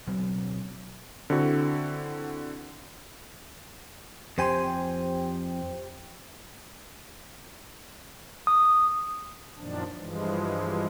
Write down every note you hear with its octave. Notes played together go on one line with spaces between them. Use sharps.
D2 B2 F#3 C4
D3 C4 E4 F#4
F2 G4 C5 G5 G#5 C6
D#6
F#2 A#2 D#3 F3 D4
G2 E3 F3 G#3